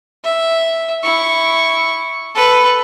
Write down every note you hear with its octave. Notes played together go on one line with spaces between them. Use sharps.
E5
E4 C#6
A4 B4